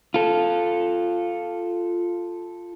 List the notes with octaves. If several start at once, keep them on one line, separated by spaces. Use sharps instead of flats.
F4 A4